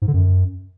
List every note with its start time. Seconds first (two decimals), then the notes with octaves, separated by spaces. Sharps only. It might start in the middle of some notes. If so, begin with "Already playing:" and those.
0.02 G#2
0.08 D3
0.14 F#2